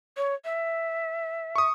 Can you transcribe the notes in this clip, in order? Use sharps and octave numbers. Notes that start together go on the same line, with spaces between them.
C#5
E5
C#6 D#6